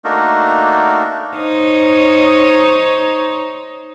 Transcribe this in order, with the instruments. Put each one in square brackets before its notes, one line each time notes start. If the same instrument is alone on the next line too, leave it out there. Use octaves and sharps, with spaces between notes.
[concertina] A3 A#3 D4 D#4 F#4 A#4
[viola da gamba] D#4 C5 C#5